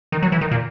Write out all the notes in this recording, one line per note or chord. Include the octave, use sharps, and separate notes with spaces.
D#3
F#3
E3
D#3
A#2